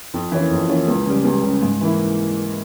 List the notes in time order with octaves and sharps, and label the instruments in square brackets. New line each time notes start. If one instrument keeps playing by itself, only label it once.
[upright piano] F2
E3 A#3 C#4 F4
F2
E3 A#3 C#4 F4
C#2
C#3 G3
C#2
C#3 G3
G#2
E3 A#3 E4